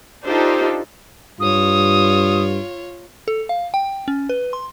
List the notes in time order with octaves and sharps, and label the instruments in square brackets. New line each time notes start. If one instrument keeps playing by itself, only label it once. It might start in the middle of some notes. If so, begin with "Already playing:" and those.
[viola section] D4 D#4 F4 G4 A4 C5
[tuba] G2 [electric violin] F4 C#5 [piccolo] D#6
[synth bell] A4
F5
G5
C#4
B4
C6